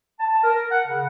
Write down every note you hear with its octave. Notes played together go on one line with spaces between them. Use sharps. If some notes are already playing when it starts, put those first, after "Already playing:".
A5
A#4
F#5
C#3